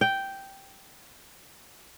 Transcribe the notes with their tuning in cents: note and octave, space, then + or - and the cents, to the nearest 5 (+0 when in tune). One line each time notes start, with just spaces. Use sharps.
G5 -5